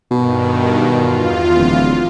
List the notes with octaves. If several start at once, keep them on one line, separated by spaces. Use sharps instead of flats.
G2 B2 D#3
E2 F4
D1